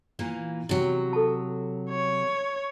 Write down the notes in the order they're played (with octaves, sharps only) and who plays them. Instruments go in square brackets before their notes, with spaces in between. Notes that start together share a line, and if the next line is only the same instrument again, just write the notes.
[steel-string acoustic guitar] A#2 E3 A#3
C3 F#3
[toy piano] A4 A5
[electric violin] C#5